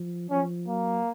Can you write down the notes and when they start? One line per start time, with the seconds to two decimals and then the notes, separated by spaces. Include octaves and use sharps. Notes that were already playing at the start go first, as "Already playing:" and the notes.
Already playing: F3
0.30 F3 C#4
0.68 F#3 A#3